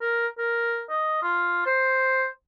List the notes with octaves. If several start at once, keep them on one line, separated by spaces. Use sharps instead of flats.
A#4
A#4
D#5
F4
C5